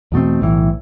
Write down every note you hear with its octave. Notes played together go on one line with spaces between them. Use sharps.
E2 B2 A3 C4
B1 A2 E3